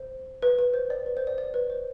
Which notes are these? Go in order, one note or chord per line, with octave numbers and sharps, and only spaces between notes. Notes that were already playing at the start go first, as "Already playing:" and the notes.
Already playing: C5
B4
B4
C5
D5
B4
C5
D5
D5
B4
C5